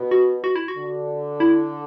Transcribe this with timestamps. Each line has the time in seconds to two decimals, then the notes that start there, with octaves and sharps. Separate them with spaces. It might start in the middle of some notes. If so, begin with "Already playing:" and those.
Already playing: B2
0.11 F#4
0.44 F#4
0.56 E4
0.68 F#4
0.76 D3
1.40 E4